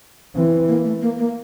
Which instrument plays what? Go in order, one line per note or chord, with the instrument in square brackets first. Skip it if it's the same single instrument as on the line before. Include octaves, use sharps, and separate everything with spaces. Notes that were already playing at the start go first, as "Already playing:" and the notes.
[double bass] E3 [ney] C4
[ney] C4
A#3
A3
A#3
A#3